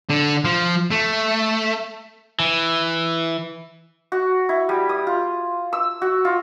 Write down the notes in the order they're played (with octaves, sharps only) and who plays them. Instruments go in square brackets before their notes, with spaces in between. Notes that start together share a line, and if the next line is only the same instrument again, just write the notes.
[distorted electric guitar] D3
F3
A3
[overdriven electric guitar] E3
[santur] F#4
E4
G3
D#6
F4
E6
F#4
F4